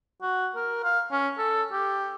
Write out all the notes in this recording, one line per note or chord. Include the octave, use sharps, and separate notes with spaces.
F#4
A#4
F5
C#4
A4
G4